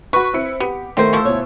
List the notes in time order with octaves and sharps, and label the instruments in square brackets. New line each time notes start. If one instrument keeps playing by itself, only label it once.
[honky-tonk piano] F#4 B5 C#6 [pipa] B4
[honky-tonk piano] C4 E4 C#7
[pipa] B3 [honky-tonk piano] G4
[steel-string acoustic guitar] D#3 A3 B3 [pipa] C4 C5
[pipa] F3 C5 [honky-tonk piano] C#6 E6
[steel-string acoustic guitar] D2 E4 C#5 [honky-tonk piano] B2